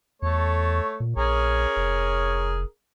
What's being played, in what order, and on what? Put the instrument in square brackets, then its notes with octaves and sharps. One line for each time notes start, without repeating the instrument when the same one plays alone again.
[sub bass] E2 [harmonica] A3 A4 C#5
[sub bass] A#2
[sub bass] A#1 [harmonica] C#4 G#4 A#4
[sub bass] F1